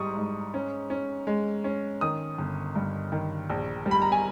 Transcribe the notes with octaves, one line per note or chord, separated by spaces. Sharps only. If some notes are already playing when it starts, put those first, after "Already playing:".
Already playing: G#2 G3 C#6 D#6
G#2
C#4
C#4
G#3
C#4
D#3 D#6
G1
G2
D#3
A#1
G3
B5
A#5
G#5